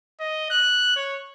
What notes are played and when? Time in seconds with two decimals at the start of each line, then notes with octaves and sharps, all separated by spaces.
0.20 D#5
0.51 F#6
0.96 C#5